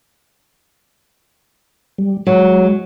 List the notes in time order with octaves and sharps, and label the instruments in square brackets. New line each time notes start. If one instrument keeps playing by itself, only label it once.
[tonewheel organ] G3
[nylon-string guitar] F#3 [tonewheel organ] G#3